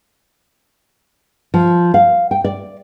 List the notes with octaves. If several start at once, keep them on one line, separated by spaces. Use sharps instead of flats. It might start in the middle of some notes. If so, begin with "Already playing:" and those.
F3
F5
G5
D5